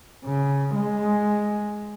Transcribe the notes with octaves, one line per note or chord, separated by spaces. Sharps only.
C#3
G#3